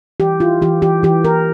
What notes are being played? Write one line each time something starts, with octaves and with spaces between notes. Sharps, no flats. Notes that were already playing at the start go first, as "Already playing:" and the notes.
E3 G4
E4 F4
E3 G4
E3 G4
E3 G4
E3 A#4